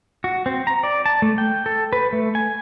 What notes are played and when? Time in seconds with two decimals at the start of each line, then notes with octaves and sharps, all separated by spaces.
0.24 F#4
0.46 C4
0.67 A#5
0.83 D5
1.06 A5
1.22 A3
1.38 G5
1.66 A4
1.93 B4
2.13 A3
2.35 G#5